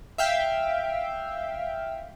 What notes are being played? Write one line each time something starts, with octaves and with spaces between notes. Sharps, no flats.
E5 F5 G5